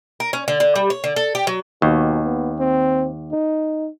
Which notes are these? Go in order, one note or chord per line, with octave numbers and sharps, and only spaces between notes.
A#4
C#4
D3
D3
G3
C#5
D3
A4
G4
F#3
D#2 B2
B3
C4
D#4